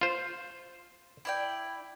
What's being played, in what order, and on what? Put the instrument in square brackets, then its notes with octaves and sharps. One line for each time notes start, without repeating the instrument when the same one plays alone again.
[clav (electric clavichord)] F4 C5
[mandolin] E4 D5 G5